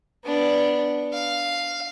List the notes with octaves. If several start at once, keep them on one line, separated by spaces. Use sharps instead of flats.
B3 D4
F5